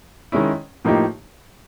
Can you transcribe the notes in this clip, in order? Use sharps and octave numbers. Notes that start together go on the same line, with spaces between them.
D#3 G#3 C#4 E4
A2 F3 A#3 D#4 G4